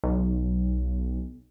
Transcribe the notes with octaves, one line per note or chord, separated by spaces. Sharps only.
B1